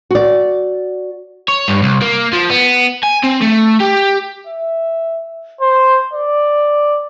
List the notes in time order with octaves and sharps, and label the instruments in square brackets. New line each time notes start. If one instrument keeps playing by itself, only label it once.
[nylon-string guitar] F#4 D5
[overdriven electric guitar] C#5
G2
C2
A#3
F3
B3
G#5
C4
A3
G4
[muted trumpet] E5
C5
D5